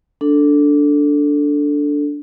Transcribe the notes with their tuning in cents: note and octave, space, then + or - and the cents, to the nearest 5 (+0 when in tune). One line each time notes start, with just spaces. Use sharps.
D4 -10 A4 +5